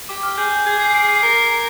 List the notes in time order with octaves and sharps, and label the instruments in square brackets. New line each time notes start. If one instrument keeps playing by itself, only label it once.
[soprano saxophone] G4 [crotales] D6
[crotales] F6
[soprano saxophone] G#4 [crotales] G6
[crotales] G6
[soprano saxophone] G#4 [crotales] G#6
[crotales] C7
D7
C7
[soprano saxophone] A#4 [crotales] C7